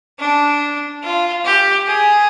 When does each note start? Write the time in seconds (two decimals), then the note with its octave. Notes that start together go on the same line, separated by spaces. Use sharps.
0.20 D4
1.03 F4
1.45 G4
1.87 G#4